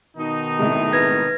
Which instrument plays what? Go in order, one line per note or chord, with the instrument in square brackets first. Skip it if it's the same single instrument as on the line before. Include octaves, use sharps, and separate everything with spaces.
[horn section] B2 D#3 D#4
[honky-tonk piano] A2 C3 G#3
[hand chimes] B4 G#6 A#6